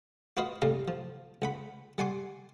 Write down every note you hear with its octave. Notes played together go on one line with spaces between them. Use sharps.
F4 F#4 B4 D#5 F5
C2 A2 G3 F5 A#5
F3
C#2 F#5 B5
G3 F#5 G#5 C6 D6